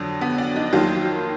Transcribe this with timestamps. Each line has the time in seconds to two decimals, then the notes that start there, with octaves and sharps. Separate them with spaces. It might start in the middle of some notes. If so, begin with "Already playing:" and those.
Already playing: F2 D3 F#3 D4
0.21 B3
0.38 D4
0.56 D#4
0.73 F2 D#3 F#3 A#3 F4